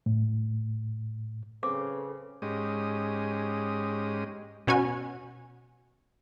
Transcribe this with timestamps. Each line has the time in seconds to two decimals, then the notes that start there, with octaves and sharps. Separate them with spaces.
0.06 A2
1.63 C#3 C4 A4 B4 D6
2.42 G#2 G#3 C#4 G4 D#6
4.67 B2 C#4 F#4 G#5